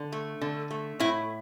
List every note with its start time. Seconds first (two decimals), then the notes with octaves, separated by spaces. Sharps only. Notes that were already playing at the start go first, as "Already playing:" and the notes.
Already playing: D3
0.12 A3
0.41 D3
0.71 A3
1.00 A2 E4